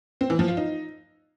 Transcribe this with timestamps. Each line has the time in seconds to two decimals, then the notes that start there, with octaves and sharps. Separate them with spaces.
0.21 C4
0.30 E3
0.39 F3
0.48 F4
0.57 D#4